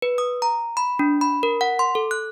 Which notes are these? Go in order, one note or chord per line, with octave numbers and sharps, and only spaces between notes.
B4
D#6
A#5
B5
D4
B5
A#4
F#5
C6
A4
F#6